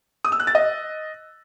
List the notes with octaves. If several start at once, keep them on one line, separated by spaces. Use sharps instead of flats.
D#6
E6
F#6
A6
D#5